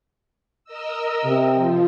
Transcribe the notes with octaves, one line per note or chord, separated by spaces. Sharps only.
A#4 D#5 E6
C3
F3 F4